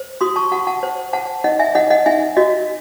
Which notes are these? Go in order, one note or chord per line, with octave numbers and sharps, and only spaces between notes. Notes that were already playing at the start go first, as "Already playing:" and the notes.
Already playing: C5
F#4 C6 D#6
A5 C#6
F#4 F#5 A5
F#5 A5
C5
C5 F#5 A5
D#4 D#5 F#5
E5 G#5
D#4 D#5 F#5
D#5 F#5
D#4 E5 G#5
F#4 D#5